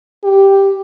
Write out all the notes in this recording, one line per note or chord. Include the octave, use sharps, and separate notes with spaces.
G4